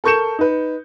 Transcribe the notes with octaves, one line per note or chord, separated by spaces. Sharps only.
A4 A#4 C#6 G6 C#7 E7
D#4 B4